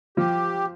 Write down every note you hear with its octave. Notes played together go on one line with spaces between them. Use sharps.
F3 G4